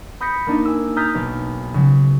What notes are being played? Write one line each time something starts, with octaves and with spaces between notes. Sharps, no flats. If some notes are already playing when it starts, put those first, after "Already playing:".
B5 D#6 G6 A#6 B6 C#7
A#3 D4 D#4
G#5 E6
A#5 D#6 F6 G6 A6 B6
B1
C#3 F#3